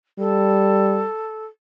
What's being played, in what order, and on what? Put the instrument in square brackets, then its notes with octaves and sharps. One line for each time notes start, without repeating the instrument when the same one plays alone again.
[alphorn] G3 [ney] A4